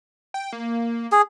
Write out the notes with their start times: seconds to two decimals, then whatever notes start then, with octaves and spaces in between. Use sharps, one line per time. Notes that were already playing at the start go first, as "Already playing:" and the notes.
0.34 G5
0.53 A#3
1.12 G#4